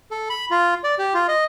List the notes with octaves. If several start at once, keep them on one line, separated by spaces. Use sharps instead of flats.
A4
B5
F4
D5
G4
F4
D#5